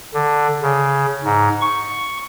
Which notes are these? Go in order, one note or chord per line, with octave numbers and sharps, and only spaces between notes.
D3
C#3
G#2
C#6